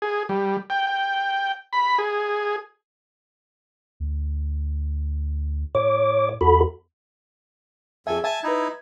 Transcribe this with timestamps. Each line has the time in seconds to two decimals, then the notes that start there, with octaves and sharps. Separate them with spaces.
0.02 G#4
0.29 G3
0.70 G5
0.87 G5
1.73 B5
1.98 G#4
4.00 D2
5.75 A2 C#5 D6
6.41 E2 F#4 A4 B5
8.07 F2 G#4 A4 E5 G#5
8.24 E5 G#5 A5
8.44 D#4 E4 B4 G#6